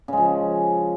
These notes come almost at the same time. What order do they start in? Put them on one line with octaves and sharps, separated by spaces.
C#3 G#3 F3